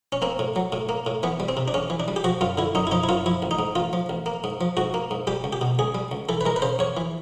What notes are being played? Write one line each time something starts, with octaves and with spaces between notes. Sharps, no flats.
C#4
A#3 C4
A2
F#3
A2
A#3
A2
E3 B3
G3
C4
C3
D4
E2 C#4
E3
D4
G3
G4
F3 F#4
F#2 F4
D3 E4
F#2 D#4
E4
F3 D#4
E4
F#2 F4
F3 E4
A1
D#4
G#2
A1 F4
F3
A1
A#3
G#2
F3
G#2 F#4
A#3
G#2
G3 G4
C#2
G4
B2
C#2 G#4
G3
C#2
E3 A4
B4
G#3 A#4
B4
C#3 C5
E2 C#5
E3